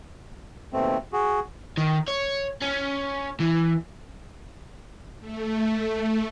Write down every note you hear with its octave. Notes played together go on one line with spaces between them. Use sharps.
D#2 B2 A3 C4
F#4 G#4
D#3
C#5
C#4
E3
A3